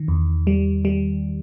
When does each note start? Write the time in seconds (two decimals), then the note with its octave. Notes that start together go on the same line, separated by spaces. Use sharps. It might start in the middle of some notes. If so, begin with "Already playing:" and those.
Already playing: D#3
0.08 E2
0.47 G3
0.85 G3